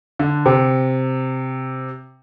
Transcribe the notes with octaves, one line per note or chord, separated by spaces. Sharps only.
D3
C3